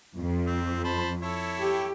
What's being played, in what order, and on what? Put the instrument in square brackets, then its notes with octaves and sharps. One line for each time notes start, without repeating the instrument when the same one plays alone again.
[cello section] F2
[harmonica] C4
C5 A5 B5
E4 A4 C#5
[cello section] G4